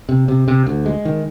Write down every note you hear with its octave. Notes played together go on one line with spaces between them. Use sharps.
C3
C3
C3
D2
G#3
D#3